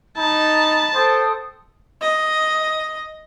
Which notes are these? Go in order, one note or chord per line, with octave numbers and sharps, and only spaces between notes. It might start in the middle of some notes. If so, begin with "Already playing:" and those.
D#4 A5 B5
A4 C5 G5 D#6
D#5